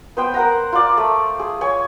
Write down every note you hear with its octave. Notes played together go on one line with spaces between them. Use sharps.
B3 C5 G5
A#4 F#5 A#5
F4 D5
A3
G#4
C#5 G#5